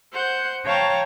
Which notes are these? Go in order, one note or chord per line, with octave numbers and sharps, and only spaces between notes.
C5 F#5 G6
C#5 F5 G5 A5 A#5 C#6